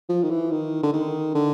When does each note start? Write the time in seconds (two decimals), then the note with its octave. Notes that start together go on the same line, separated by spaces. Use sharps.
0.09 F3
0.23 D#3
0.30 E3
0.51 D#3
0.83 D3
0.93 D#3
1.35 D3